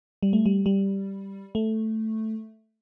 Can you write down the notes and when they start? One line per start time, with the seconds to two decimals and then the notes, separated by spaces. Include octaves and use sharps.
0.23 G3
0.33 A3
0.46 G3
0.66 G3
1.55 A3